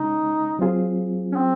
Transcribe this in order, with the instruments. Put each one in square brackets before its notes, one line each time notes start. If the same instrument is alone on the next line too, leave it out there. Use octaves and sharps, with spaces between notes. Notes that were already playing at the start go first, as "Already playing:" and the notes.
Already playing: [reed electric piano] C#3 G#3 C#4 [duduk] D#4
[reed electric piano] F#3 C4 F4 G#4
[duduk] C#4
C4